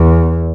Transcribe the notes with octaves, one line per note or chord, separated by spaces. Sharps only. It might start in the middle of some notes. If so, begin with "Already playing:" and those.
Already playing: E2